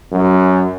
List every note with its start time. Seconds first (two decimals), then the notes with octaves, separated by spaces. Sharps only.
0.11 F#2